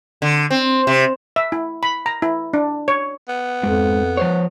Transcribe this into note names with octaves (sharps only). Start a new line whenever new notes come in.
D3
C4
C3
E5
E4
B5
A#5
E4
D4
C#5
B3
F2 G#2
F3 C5 C#5